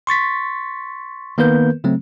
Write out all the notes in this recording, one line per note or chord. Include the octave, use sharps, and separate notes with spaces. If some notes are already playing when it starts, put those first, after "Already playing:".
C6 C#6 A6 B6
D#3 A#3 B3 A#4 B4 G6
C#3 F#3 A3 C4